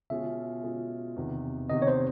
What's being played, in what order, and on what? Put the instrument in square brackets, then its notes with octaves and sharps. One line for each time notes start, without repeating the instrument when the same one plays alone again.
[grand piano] B2 G#3 C#4 F4 G#4 [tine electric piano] E5
[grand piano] B2 G#3 C#4 F4 G#4
E2 C3 D#3
[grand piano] E2 C3 D#3 [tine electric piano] D#5
[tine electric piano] C#5
C5